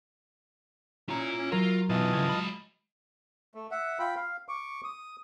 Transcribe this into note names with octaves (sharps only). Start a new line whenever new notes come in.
C#4 E4 F4 A#5
C#4
F#3 F4 A#4
B2 D#3 E3 F4 D#5 A5
C#3 F3 G#6
G#3 B5
A3
E5 F#5
F4 G5 B5
F5
C#6 D6
D#6